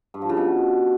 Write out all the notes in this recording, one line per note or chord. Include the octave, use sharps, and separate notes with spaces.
G2
F3
C#3
B2